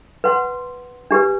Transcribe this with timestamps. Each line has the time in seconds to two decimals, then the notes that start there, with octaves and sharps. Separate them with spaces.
0.24 B4 F#5 C6
1.11 D4 G4 B4